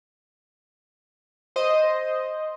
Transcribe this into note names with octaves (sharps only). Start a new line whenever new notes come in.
C5 D#5